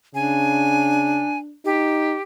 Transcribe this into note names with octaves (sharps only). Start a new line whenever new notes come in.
C#3 D4 G#5
D#4 G4